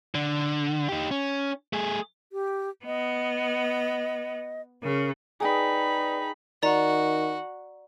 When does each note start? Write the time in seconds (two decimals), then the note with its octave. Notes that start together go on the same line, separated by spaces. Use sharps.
0.15 D3
0.89 D#4 G4
1.11 C#4
1.73 A3 G#4
2.33 G4
2.85 B3 D#5
4.83 C#3 A#4
5.40 D#4 G#4 B4 D5 G5 A#5 B5
6.63 D#3 F#4 D5 A#5